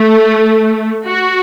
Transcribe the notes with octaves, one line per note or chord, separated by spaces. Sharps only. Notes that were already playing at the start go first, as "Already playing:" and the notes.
Already playing: A3
F#4